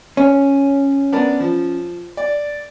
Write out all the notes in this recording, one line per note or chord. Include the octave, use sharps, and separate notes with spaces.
C#4
B3 D4 A#4
F3
D5